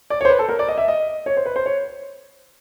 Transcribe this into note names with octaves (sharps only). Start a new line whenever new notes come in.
D5
C#5
C5
B4
A4
A#4
D5
D#5
E5
D#5
C#5
C5
B4
C5
C#5